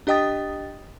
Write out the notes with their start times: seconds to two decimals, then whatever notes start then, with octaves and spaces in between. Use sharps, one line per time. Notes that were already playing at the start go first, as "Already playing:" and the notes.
0.07 D4 G4 D#5 G5 D#6 A6